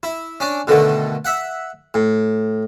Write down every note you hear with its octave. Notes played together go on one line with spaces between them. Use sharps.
E4
C#4 D4
B2 D3 D#3 A3
E5 F#5
A2